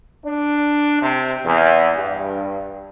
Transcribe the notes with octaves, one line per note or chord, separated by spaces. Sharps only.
D4
C3
E2
G2